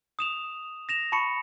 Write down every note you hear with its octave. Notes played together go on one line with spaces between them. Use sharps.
D#6 E7 F7
A#6 E7 F7
A5 B5 C#6 C#7